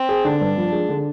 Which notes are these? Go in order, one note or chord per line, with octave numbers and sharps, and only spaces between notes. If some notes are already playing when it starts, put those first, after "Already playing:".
Already playing: C4
G#4
D3 D4
G2
F3
G#3
D3